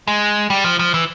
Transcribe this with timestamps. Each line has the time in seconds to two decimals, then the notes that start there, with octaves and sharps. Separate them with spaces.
0.08 G#3
0.50 G3
0.64 F3
0.79 F3
0.94 E3